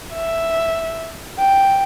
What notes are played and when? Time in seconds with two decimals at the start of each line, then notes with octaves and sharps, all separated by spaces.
0.13 E5
1.39 G5